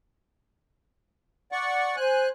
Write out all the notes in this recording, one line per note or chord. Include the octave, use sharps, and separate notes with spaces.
D5 F#5 C#6
C5 G#5 F#6